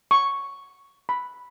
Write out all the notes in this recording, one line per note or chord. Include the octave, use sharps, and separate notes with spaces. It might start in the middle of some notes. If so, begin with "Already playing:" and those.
C#6
B5